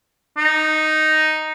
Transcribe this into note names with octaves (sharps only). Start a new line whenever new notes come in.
D#4